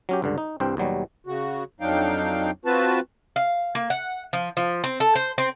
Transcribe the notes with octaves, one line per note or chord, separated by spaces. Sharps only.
F#3 C#4 G4
C#2 G2 D3
D#4
C2 G2 C4 C5 G5
D#2 B2 F#3 G3
C#3 F#4
F2 F#3 D4 D#4 F5 G5
C4 F4 F#4 B4 A5
F5
A#3
F#5
F3
F3
C4
A4
C5
C4